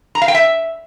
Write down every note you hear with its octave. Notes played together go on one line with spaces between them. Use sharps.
A#5
F5
G5
E5